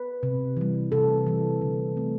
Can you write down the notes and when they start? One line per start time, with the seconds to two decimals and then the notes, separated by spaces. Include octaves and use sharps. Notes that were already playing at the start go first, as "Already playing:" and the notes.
Already playing: B4
0.23 C3
0.57 E3 G3
0.92 C3 A4
1.27 E3 G3
1.61 D3
1.97 A3 C4